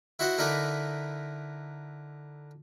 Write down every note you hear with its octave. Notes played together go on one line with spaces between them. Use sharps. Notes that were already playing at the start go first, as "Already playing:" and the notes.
E4 F#4 C5 D#5 F#5
D3 D#4 E4 A#4 B4 D5